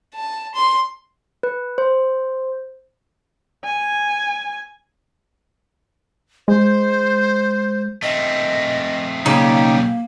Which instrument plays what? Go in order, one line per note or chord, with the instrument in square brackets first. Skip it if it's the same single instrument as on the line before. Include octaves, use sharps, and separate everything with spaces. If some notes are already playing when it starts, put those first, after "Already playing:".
[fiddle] A5
C6
[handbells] B4
C5
[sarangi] G#5
[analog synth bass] G#3 [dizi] C5
[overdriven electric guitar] A3 C4 [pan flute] D#5
[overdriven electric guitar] B1 G3 [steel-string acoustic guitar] C#3 [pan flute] A#3 [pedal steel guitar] D#4 G4